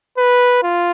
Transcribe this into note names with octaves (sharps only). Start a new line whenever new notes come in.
B4
F4